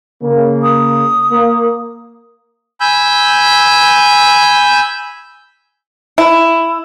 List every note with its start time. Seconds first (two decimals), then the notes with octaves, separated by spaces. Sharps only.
0.23 C#3 A#3
0.62 D#6
1.31 A#3
2.80 G#5 B5 E6 G6
6.18 E4